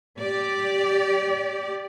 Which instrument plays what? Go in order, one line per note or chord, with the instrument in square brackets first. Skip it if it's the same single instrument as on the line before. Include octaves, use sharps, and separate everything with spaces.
[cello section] G4 D5